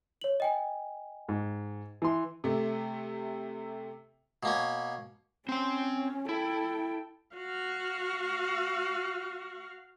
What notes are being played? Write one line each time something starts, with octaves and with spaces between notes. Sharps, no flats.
C#5 F#7
D#5 G5 G#5
G#2
E3 C6
C3 A3
B2 A#3 C#4
C4 C#4 G5
E4 A4 G5
F#4 F5